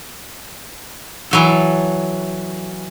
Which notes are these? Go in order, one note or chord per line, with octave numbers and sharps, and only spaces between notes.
E3 F#3 A4